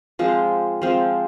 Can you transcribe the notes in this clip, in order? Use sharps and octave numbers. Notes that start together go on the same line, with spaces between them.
F3 G#3 C4
F3 G#3 C4